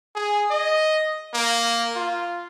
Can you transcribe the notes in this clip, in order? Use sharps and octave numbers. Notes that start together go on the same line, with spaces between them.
G#4
D#5
A#3
F4